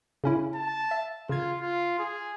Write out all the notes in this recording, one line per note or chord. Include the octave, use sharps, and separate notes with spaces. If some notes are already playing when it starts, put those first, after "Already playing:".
C#3 C#4 E4
A5
E5
C#3 F4 G#6
F4
G#4